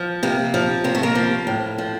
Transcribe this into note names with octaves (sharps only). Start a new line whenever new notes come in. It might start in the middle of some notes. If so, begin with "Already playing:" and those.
Already playing: F3
C3 A#3
F3
C3 A#3
A3
A#3
F3
A2
F3